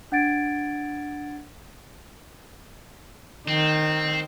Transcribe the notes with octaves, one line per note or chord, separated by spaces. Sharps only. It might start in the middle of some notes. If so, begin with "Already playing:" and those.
D4 F#5 G#6 A6 D7
D#3 C4